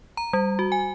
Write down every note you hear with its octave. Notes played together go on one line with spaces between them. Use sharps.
A#5
G3
F#4
G#5